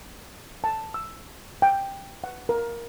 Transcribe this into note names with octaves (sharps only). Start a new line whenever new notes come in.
A5
E6
G5
F#5
A#4